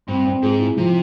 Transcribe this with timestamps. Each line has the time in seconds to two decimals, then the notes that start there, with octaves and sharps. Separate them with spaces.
0.08 G2 C4
0.25 C4
0.42 G#2 G#4
0.60 E4
0.77 C3 F3